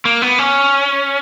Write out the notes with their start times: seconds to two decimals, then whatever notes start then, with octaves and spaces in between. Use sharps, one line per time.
0.05 A#3
0.22 B3
0.39 C#4